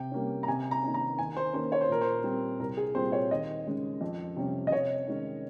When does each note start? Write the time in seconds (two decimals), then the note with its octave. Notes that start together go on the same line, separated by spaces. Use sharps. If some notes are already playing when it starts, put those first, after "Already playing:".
Already playing: C3 G5
0.12 G3 A#3 C#4
0.43 A#5
0.48 C3 G#5
0.71 A#5
0.83 D#3 A#3 C#4
0.94 A#5
1.18 D#2 G#5
1.37 C5
1.53 D#3 A#3 C#4 C5
1.72 C#5
1.81 C5
1.88 A#2 A#4
2.01 C5
2.24 G3 C4
2.59 C2 A#4
2.77 G#4
2.95 A#2 G3 C4 C5
3.12 C#5
3.31 D#2 D#5
3.66 C#3 G#3 C#4
4.01 F2
4.36 C3 G3 C#4
4.67 D#5
4.72 C3 C#5
5.08 D#3 G#3 C#4